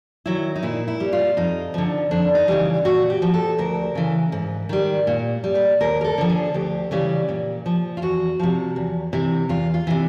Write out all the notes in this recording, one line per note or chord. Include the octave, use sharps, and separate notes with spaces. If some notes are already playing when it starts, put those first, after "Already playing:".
D#3 F#3 E4
D#4
A#2 E4
E4
G3
F4
F2 D#4
D3 F3
F2 D4
D#4
C#3 E3 G3
A#2 F#4
G4
F3
A4
D2 A#4
C#3 E3
G#2
D#3 G3
A#2
G3
B4
D#2 A#4
A#4
A4
D3 F3
G#4
D2 G4
C#3 E3 G3
A#2
F3
F4
E2 F#4
C3 F3
E2
C3 E3
E2 F4
F4
C3 E3